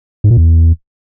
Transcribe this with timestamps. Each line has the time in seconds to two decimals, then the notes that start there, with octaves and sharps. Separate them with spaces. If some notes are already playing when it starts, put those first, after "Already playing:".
0.24 G#2
0.31 A#2
0.37 E2